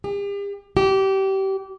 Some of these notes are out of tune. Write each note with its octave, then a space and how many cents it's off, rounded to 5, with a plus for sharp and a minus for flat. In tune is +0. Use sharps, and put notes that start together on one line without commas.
G4 +45
G4 -25